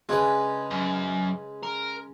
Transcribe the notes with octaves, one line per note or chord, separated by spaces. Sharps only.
C#3 G#3 D4 A#4 B4
F#2
A#4